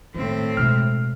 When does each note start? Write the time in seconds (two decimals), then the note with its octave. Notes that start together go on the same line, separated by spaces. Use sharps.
0.15 A2 D#3 C4
0.57 B2 G#3 F6